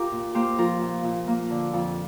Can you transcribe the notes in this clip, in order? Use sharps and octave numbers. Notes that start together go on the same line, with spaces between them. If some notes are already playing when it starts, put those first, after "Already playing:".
Already playing: F4 G4 A#4
A#2
A#3 G4 C5
F3 F4 A#4
A#2
A#2
A#3
D3
F2